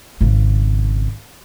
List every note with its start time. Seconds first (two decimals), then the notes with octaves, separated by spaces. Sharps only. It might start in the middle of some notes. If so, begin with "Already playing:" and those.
0.21 G#1 C#3